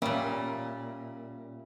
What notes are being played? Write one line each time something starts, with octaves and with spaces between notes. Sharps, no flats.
A#2 G3 A#3 C#4 E5